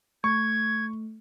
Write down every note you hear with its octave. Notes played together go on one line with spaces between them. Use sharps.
A3 C#6 G#6